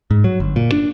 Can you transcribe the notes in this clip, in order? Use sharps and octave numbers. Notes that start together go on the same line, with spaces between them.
G#2
F#3
G1
A#2
D4